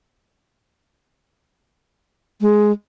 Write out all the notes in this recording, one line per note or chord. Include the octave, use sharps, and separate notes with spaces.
G#3